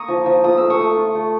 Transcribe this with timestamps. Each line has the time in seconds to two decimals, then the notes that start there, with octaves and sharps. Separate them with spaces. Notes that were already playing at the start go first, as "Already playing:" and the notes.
Already playing: A#3 A#5 C#6 D#6
0.08 F3
0.26 F3
0.44 F4 D#6
0.57 A3 E6
0.70 C#6 D#6
0.79 A3
0.97 F4
1.15 A3